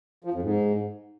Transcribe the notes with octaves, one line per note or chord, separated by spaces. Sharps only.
F3
F2
G#2